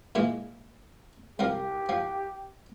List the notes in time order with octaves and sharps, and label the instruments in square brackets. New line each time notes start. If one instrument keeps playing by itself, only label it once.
[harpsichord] A#2 E3 G#3
[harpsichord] C2 F3 A#4 [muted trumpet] G4
[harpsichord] F3